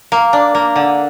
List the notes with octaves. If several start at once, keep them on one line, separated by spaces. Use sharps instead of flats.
A#3
D4
A#3
D3